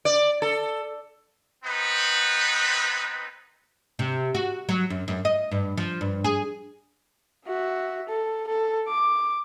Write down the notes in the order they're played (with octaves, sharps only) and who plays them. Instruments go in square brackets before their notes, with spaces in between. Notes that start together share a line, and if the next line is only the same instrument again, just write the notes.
[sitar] D5
A4
[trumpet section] B3 C4 D#4 B4
[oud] C3
F#4
F#3
F#2
F#2
D#5
G2
F3
G2
G#4
[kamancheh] F#4 E5
A4
A4
D6